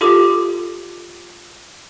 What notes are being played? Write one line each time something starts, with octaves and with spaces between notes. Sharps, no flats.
F4 G4 A4 D6